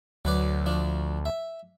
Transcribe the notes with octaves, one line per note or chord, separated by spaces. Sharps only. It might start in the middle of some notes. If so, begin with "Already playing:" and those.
D2 F#3 B4 D5
F3 D4
E5